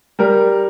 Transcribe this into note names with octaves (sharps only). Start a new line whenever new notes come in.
G3 A#4